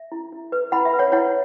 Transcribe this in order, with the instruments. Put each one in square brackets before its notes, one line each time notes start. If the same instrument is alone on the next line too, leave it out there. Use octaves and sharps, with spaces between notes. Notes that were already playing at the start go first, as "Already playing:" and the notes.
Already playing: [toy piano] E5
E4
E4
B4
E4 F#5 B5
E5
B4
C#5 F#5
E4 C#5 F#5